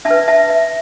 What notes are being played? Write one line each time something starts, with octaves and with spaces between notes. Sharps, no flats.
D4 E5 A5
B4
E5 A5
E5